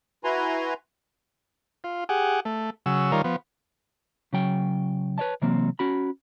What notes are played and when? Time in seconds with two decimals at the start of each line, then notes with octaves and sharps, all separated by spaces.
0.24 E4 F#4 B4 G#5 A#5 C6
1.84 F4
2.09 G4 G#4 F#5
2.45 A3
2.86 C#3 F#3 E6
3.12 D#3 G3 F4 A#4 C#5
3.24 F3 B3
4.33 C#3 F#3 G5
5.18 B4 C#5 D#5 A5
5.42 C3 E3 F#3 A#3 C4
5.79 C#4 F#4 B5